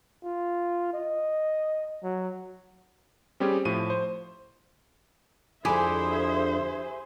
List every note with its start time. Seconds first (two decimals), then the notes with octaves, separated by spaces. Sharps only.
0.23 F4
0.94 D#5
2.03 F#3
3.40 G3 C4 C#4 G4 G#4
3.65 A2 F3 D#7
3.90 C5
5.65 F2 D3 E4 G4 G#4 C5 E5 G#5